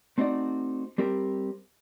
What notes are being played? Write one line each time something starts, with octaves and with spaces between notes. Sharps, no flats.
A3 C4 D#4 F#4 D5
G3 C4 G4 A#4